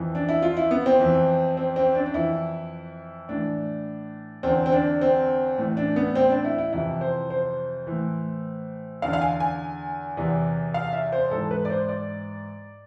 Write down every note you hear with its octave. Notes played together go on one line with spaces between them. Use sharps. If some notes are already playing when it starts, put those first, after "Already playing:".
Already playing: F2 E3
D4
E4
F4
E4
B3
C4
F2 E3
C4
C4
D4
D4
F2 E3 E4
A2 E3 D4
E2 D3 C4
C4
D4
C4
A2 E3
D4
B3
C4
D4
E4
E4
F2 C3 E3 E4
C5
C5
A2 E3
E2 D3 F5
F5
G#5
G#5
E2 C3 E3
F5
E5
C5
G#2 E3 A4
B4
D5
C5
D5